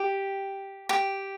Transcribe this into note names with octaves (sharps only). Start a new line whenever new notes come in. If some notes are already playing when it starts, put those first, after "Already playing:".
Already playing: G4
G4